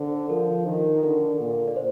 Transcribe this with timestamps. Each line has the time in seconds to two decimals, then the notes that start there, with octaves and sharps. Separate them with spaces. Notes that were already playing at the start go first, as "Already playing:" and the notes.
Already playing: D3 C5
0.30 F3 A#4
0.67 D#3
1.03 D3 A#4
1.40 A#2
1.68 D5
1.76 C5